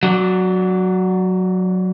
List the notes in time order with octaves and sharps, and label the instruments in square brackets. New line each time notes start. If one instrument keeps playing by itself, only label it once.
[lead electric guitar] F#3 D4